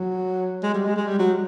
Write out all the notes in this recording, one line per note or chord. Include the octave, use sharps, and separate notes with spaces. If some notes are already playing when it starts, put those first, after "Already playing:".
Already playing: F#3
G#3
G3
G#3
G#3
G3
F#3